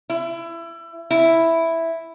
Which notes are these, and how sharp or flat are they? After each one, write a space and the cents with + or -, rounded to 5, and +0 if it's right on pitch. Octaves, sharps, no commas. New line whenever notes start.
E4 +25
E4 +0